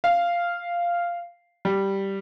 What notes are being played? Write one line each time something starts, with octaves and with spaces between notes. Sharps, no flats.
F5
G3